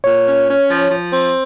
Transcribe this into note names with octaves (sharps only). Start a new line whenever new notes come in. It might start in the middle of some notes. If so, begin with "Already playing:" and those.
A#2 C#5
C#4
C#4
F3
F3
C4